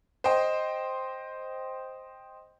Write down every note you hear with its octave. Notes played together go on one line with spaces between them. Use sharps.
C5 D#5 G5